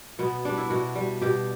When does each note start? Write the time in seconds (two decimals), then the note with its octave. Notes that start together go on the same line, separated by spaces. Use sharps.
0.19 B2 B3
0.45 G3 D4
0.57 E4
0.70 B2 F#4
0.95 G3
1.21 B2 G4